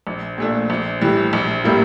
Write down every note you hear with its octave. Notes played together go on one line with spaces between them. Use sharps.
A#1
A#2 A3 D4
A#1
A2 E3 G3
A#1
A2 G3 A#3 E4